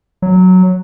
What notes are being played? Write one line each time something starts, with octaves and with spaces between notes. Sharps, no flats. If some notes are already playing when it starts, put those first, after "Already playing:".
F#3